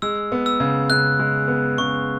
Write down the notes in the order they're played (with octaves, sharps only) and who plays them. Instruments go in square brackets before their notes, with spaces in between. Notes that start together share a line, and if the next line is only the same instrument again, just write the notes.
[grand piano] G#3 [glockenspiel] E6
[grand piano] B3
[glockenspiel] E6
[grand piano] C#3
[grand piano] C#3 [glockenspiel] F#6
[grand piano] G#3
B3
[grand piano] C#3 [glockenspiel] C#6